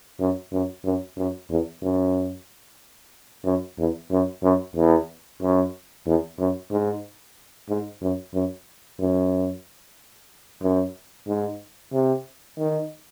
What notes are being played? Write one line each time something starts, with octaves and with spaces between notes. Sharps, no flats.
F#2
F#2
F#2
F#2
E2
F#2
F#2
E2
F#2
F#2
E2
F#2
E2
F#2
G#2
G#2
F#2
F#2
F#2
F#2
G#2
C3
D#3